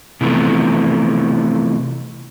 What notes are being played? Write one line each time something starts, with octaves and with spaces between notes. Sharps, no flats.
C3 E3 F3 A3 B3